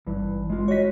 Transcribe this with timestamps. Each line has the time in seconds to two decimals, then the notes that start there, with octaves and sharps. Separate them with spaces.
0.07 G#1 G2 E3
0.50 G#3 F4
0.68 F#4 C#5 D#5 B6